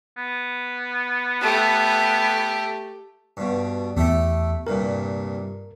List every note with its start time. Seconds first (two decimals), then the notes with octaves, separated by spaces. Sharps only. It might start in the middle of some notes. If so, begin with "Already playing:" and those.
0.17 B3
1.41 A3 G4
3.37 G2 B2
3.97 E2 A3 G4 A4
4.67 C2 G2 A#2 A#4